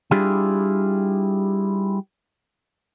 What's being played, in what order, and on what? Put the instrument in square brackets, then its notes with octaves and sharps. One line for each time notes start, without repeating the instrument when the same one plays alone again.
[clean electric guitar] G3 D4 E4 F4 G4 G#4